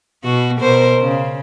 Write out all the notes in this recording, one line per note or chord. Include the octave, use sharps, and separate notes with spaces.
B2 F#4
B2 A#4 C5
C#3